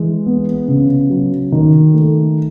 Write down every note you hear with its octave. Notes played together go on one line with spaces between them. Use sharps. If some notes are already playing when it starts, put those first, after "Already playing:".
Already playing: E3 G#3
B3
C#3
F#3
D#3
A3